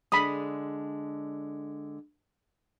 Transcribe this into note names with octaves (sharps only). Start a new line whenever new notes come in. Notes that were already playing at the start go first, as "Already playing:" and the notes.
D3 G#3 B5 D#6